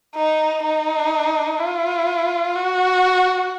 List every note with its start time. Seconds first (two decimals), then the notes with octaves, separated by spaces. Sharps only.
0.15 D#4
0.63 D#4
1.60 F4
2.55 F#4